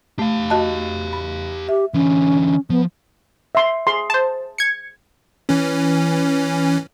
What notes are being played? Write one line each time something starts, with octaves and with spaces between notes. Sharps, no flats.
A3 G4 F5
F#4 D#5 A5
B5
G4 E5
D3 E3 C#4
F3 B3
E5 C6
G#4 C6
C5 A5
G#6 C#7
E3 C#4